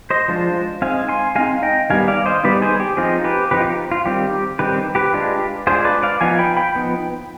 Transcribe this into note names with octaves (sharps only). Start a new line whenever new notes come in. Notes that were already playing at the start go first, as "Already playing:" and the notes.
C5 D#5
F3 G#3 D4 F4
G#3 C4 D#4 F5 G#5
G#5 C6
G#3 C4 D#4 F5 G#5
D#5 G5
D#3 G3 B3 D#4 F5 G#5
D5 F5
C5 D#5
D#3 G3 B3 D#4 B4 D5
G#4 C5
G4
F3 C4 D#4 F4 G#4
G4 B4
F3 C4 D#4 G4 B4
F4
G4
F4
D#3 G3 C4 G4
D#3 G3 C4 G4 B4
G4 B4
G#3 D4 F4
G#3 D4 F4 G#4 C5
B4 D5
D5 F5
F3 B3 D#4 F5 G#5
G5 B5
G5 B5
F3 B3 D#4